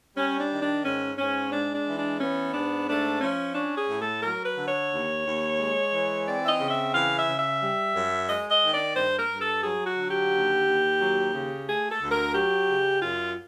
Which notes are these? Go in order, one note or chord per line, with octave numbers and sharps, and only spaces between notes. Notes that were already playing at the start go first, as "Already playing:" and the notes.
G3 C#4
D4
D#3
D4
G#2 C#4
G#2 C#4
G#3 D4
D4
E3
D4
B3 C#4
G#2 D4
A3 D4
F3 C#4
C#4 D4
G#4
A2
A4
F#3 A#4
B4
D3
C#5
D#2
D#2
G#3
E3
C4 D5
E5
D#5
C#3
E5
E3 F5
E5
C#3
E5
G3
F#2
G#3 D#5
D#5
D#3
D5
G2 C5
A#4
G2
A4
F#3 G#4
F#4
D3
G4
D#2
D#2
F#3
C#3
A3 G#4
A4
D2
A#4
F#3 G4
C#3
F#2 F4